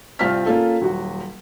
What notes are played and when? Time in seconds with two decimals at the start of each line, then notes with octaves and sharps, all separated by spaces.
0.19 C2 C4 F4 D5 F6 B6
0.46 A#3 C#4 F4 A4
0.81 D#1 F#3 F#4